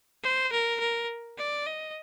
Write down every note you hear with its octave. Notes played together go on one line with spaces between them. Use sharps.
C5
A#4
A#4
D5
D#5